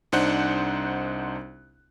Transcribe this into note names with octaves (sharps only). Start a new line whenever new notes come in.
C2 D4 D#4 C5 F#5 F#6